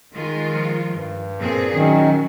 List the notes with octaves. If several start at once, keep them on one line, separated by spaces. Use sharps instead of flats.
D#3 G#3 F4
F3
G2
A#2 C4 G#4
D#3 F#3 C#4